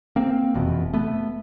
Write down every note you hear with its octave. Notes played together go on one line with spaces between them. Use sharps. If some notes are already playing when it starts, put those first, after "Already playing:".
A#3 C4
F1 E2 B2
A3 B3